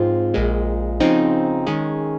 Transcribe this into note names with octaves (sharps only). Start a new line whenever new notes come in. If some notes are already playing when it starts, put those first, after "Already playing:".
Already playing: G#2 F3 C4 F4
A#1 A#2 G#3
C#3 F3 C4 D#4
D#3 G#3 C#4 G#4